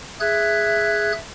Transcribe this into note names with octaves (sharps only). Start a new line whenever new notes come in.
G#4 E5 F#6 G#6